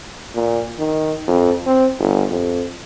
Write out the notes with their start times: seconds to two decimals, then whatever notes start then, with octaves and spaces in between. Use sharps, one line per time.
0.35 A#2
0.79 D#3
1.28 F2
1.66 C4
1.99 G1
2.30 F2